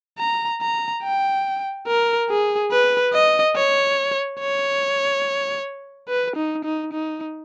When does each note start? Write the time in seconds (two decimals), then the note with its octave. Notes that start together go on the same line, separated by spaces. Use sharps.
0.19 A#5
0.62 A#5
1.04 G5
1.88 A#4
2.30 G#4
2.72 B4
3.13 D#5
3.56 C#5
4.40 C#5
6.09 B4
6.36 D#4
6.65 D#4
6.93 D#4